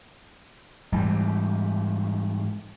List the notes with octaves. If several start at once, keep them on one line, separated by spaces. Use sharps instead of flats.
G#2 E3 G3